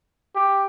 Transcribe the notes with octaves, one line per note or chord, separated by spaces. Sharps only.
G4